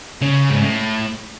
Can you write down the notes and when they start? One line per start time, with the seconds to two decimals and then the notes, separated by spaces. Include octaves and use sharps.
0.22 C#3
0.50 G#2
0.62 A2